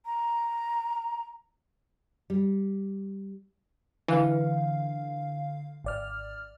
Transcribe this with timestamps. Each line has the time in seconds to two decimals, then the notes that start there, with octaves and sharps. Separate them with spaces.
0.05 A#5
2.30 G3
4.08 D3 E3 F5
5.84 G#1 D5 F6